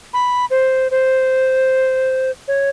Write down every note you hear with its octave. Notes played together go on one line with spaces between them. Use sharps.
B5
C5
C5
C#5